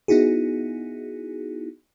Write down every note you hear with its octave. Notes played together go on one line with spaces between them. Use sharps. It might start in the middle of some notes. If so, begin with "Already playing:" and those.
B3 D#4 E4 F#4 G#4